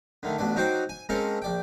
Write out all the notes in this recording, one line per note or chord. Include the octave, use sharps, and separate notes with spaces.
D3 D#3 A3
A1 B2 D4 D5
F#3 D#4 F#4 C5 G5 D6
G#5
G#3 A#3 C4 C#4 A4 A#4
A#1 D5 G5